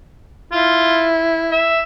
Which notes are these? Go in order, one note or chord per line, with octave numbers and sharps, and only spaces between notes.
E4 F4
E5